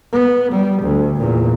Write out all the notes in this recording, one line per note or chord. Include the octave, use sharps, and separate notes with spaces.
B3
G3
D2
E2 A#2